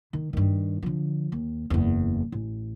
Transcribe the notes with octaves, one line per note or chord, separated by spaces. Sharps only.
D#3
G2 D#3
D3 F3
D#2
F#1 E2
A1